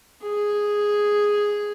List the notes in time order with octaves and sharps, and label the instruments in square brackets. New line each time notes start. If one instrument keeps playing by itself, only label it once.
[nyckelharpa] G#4